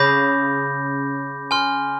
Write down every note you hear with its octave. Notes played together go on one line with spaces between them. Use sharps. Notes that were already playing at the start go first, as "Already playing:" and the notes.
Already playing: C#3 B5 D6 G6 A#6
G#5 C6 F6